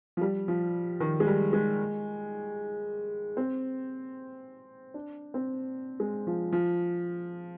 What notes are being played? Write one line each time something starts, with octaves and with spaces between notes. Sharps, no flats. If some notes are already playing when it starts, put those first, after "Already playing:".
F3
G3
F3
D#3
G#3
G3
G#3
C4
D4
C4
G#3
F3
F3